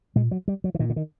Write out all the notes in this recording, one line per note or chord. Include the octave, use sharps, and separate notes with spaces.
A#2 G#3
F#3
G3
F#3
E3
A#2 D#3
D3
D#3